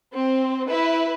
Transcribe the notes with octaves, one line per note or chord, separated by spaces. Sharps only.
C4
E4 B4